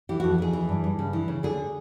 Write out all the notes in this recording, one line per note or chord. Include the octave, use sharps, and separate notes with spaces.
E3 G4
F2 F#4
F2 G#4
E3
G2
G2
C#3
E3
C#3
D3 G#4